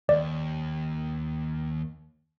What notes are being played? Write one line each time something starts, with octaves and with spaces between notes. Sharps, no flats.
D#2 D5